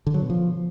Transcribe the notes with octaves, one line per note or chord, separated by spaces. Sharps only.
D3
F#3
B2
F3